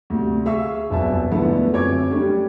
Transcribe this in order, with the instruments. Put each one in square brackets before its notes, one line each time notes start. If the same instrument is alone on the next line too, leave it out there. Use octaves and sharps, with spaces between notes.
[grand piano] D2 C3
G#4 E5 F5 C#6 E6
E1 C2 F#2 B4 E5 A5
D3 F3 G#3 A3 B3 E4
F#2 C4 C#5 D6 G#6
G3 A3 C#4 D4 G4